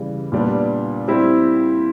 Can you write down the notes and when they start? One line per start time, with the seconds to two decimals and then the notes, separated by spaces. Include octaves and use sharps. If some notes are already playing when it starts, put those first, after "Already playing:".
Already playing: C#3 E3 G3
0.32 A#2 G3 B3 D4
1.08 G3 C4 E4 G4